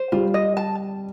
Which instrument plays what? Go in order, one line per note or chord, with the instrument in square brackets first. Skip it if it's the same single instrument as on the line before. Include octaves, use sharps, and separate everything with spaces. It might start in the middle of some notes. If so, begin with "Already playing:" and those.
Already playing: [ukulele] C5
[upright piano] G3 [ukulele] F4
[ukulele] D#5
A5